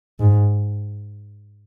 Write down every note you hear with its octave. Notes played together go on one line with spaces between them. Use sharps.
G#2